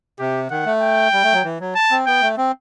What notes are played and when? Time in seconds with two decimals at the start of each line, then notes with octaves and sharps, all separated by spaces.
0.19 C3 G4
0.51 D#3 F#5
0.66 A3
0.82 G5
1.13 G3
1.24 A3
1.33 F#3
1.44 E3
1.60 F#3
1.75 A5
1.91 C4
2.06 B3 G5
2.21 A3
2.38 C4